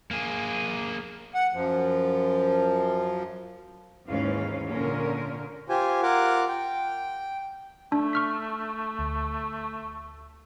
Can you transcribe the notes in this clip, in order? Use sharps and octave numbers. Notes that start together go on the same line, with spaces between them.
A#3 G#4
F#5
F#2 F3
D#2 G#2 E3 C#4 F5
A#2 D3 C#4 A#4
F4 G4 C5 G#5
F4 A#4 F#5 D6
G5
A3 D4
C#6 F6 B6
D2